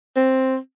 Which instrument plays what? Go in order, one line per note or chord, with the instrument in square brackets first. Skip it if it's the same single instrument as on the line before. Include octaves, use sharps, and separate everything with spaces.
[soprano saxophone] C4